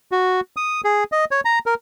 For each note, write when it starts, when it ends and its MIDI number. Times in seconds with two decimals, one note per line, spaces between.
0.12 0.40 66
0.57 0.81 87
0.84 1.04 68
1.12 1.25 75
1.31 1.41 73
1.45 1.59 82
1.66 1.74 70